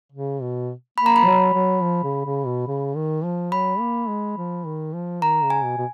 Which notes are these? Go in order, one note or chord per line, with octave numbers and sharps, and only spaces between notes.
C#3
B2
A#3 B5
A#5
B5
F3
F#3
F#3
F3
C#3
C#3
B2
C#3
D#3
F3
F#3 B5
A#3
G#3
F3
D#3
F3
D#3 A#5
C#3
G#5
B2
B2